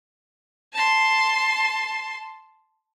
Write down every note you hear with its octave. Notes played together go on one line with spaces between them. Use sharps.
A5 C6